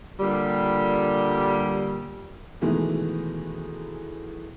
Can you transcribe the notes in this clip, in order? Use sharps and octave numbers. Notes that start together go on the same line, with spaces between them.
A#2 D3 G3
B2 D#3 E3 G#3 A3 B3